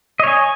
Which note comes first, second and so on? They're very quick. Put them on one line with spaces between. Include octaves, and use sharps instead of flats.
D#5 C#5 G#5